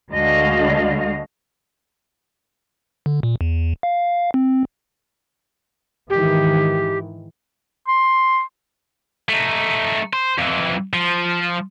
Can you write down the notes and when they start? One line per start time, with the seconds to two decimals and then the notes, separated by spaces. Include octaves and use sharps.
0.11 D2 D3 G#3 F#4 D#5 F5
3.06 D3
3.23 A#2
3.41 E2
3.83 F5
4.34 C4
6.10 G#2 D#3 E3 G4
7.88 C6
9.29 A3 D#4
10.13 C5
10.38 F2 E3
10.93 F3